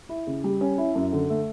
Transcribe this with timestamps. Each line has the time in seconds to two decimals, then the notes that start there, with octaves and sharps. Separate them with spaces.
0.09 E4
0.27 C#3
0.44 G3
0.61 C#4
0.78 E4
0.95 F#2
1.12 D3
1.30 A3